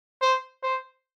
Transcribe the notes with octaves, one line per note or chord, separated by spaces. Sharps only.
C5
C5